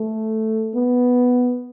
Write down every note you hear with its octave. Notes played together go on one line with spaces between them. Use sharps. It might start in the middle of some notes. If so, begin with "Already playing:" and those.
Already playing: A3
B3